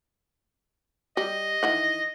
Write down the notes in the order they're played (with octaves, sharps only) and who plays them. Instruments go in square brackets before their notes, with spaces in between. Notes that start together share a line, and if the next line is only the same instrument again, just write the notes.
[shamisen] G3 [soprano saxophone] D#5
[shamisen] D#3 E3 F#5